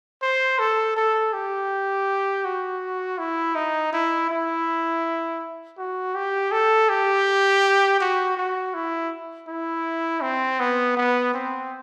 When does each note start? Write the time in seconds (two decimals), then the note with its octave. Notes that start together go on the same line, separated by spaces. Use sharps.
0.22 C5
0.59 A4
0.96 A4
1.33 G4
2.45 F#4
3.18 E4
3.55 D#4
3.92 E4
4.30 E4
5.78 F#4
6.15 G4
6.52 A4
6.89 G4
8.00 F#4
8.37 F#4
8.74 E4
9.48 E4
10.22 C4
10.59 B3
10.97 B3
11.33 C4